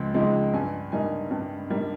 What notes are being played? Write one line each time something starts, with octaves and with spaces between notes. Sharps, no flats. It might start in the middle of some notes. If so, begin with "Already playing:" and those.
Already playing: C#2 C#3 F3 G#3
C#3 F3 G#3 D#4
G2 G#5
G3 A#3 D#4 G#5
G2 G5
G3 A#3 D#4